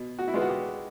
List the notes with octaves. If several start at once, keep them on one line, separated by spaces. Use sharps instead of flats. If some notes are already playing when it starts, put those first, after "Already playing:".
Already playing: B2
F#4
E4
G#3 B3 F4
F#4
G4